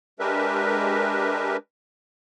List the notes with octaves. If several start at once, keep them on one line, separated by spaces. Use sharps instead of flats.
G#3 D4 G4 A#4 B4 E5